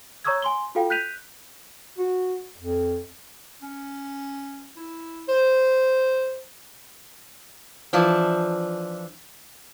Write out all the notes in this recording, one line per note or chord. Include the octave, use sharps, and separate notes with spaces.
C#5 A#5 C#6 D#6 E6 G#6
G#5 C6 G7
F4 F#4 A4 F5 G5
F#6 G6 B6 D#7 F7
F#4
F2
C#4
E4
C5
E3 F3 D4